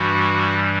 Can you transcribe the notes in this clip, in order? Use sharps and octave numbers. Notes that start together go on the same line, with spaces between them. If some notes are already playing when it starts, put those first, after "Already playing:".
Already playing: G2 E3 G3 F#4